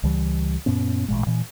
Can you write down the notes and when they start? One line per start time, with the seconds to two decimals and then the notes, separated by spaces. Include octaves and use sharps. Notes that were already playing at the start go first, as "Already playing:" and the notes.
0.04 C#2 E3 G3
0.66 F#2 A#2 B3 C#4
1.08 A1 A#2 G#3
1.27 A#2 E3